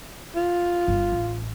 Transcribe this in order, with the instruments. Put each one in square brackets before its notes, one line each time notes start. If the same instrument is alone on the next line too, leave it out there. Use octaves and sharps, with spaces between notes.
[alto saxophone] F4
[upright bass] G1 G2
A1